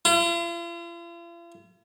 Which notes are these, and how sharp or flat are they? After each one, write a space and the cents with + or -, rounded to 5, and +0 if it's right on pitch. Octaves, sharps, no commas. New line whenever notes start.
F4 -45